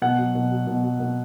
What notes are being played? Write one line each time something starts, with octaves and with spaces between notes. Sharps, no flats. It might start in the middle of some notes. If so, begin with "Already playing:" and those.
B2 F#5
F#3
B2
F#3
B2
F#3
B2